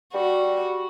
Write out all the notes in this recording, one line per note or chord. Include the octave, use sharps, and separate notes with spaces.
G3 F#4